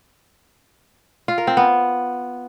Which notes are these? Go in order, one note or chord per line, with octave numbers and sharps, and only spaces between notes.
F4
A#4
C4
B3